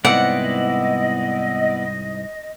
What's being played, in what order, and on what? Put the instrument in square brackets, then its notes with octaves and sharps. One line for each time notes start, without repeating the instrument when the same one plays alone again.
[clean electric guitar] C2 G#2 C4 [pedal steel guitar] B3 E4 D5 [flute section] D#5 [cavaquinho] F#5